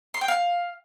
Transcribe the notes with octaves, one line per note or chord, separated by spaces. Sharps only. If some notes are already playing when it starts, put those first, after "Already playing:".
C6
G5
F5